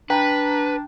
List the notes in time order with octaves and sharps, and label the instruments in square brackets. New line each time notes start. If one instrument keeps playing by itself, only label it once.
[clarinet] D4 [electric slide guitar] B4 [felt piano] G5 A#5